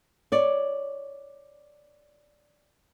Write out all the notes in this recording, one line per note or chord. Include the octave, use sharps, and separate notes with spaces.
C#5 D5